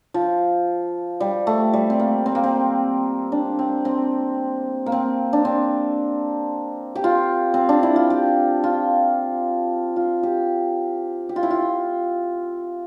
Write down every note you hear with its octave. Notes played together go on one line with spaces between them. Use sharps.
F3
G3
A3
G3
C4
A#3
C4
A#3
C4
D4
C4
C4
A#3
C4
D4
C4
G4
F4
C4
D4
E4
F4
G4
F4
F4
G4
G4
F4
E4
F4